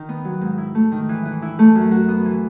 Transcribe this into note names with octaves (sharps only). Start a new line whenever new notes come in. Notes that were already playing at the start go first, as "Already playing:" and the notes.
Already playing: D#3
B3
F#3
G#2
E4
A3
D#3
E3
E3
E4
A3
F#2
F#4
B3
E3